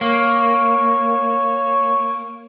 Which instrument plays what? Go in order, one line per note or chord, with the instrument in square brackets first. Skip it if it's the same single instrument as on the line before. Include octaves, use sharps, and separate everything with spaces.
[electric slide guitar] A#3 [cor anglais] C#5